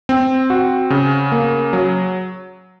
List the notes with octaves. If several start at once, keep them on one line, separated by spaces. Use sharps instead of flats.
C4
F#4
C#3
A#3
F#3